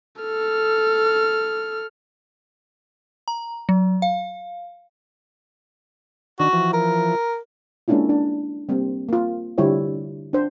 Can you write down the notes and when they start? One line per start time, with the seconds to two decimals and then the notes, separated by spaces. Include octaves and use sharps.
0.21 A4 F6
3.28 A#5
3.69 F#3
4.02 F5
6.40 D#3 D4 F#4
6.53 E3 F3
6.73 A#4
7.88 G#3 A#3 C#4 D4 E4 F4
8.09 D4
8.69 G3 A#3 C4
9.09 A#3 F4
9.58 D3 G3 E4 F4 C5 C#5
10.33 D4 C5